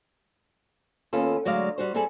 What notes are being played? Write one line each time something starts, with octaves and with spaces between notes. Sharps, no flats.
D#2 B3 C#4 F4 A4
D2 F#3 G#3 D5 F5
G3 F#4 C5
G3 C4 E4 G#4 A4